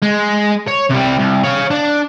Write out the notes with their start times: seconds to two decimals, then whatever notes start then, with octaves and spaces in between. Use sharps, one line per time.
0.02 G#3
0.67 C#5
0.90 C3 G3
1.18 C2
1.44 C#5 F5
1.71 D4